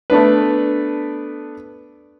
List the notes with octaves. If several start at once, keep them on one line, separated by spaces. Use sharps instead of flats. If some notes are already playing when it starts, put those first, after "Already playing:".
A3 B3 D4 B4